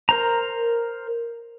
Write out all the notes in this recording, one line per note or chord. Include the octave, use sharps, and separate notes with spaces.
A#4 C5 A#5